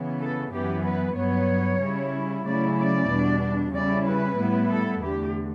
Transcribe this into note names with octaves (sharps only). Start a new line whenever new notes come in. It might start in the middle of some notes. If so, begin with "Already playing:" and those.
Already playing: C#3 E3 B3
A4
F#2 E3 B3 G4
B4
G2 F#3 B3 C#5
C#3 G3 C#4 E4
C#3 F#3 A3 C#4 E4 D5
D5
E2 B2 G3 D4
C#3 G3 C#4 E4 D5
B4
A2 G3 B3 E4
A4
E2 D3 A3 G4